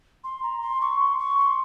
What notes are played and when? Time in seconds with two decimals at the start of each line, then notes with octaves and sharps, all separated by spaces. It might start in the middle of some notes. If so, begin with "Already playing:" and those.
0.24 C6
0.43 A#5
0.61 C6
0.81 C#6
1.00 C6
1.19 C#6
1.38 C6